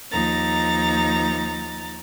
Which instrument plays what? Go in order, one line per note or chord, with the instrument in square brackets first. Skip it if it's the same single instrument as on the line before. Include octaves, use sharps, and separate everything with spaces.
[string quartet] D#2 F3 D#4 A#5 A6